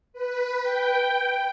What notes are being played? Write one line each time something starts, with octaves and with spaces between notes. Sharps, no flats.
B4
G5